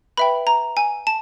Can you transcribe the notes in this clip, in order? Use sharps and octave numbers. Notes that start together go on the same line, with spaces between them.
B4 E5 G5 B5
A#5
G#5
A5